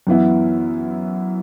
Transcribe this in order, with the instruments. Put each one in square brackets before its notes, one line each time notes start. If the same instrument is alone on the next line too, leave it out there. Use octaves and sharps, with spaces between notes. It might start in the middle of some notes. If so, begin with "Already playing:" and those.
[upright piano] F#2 E3 B3 E4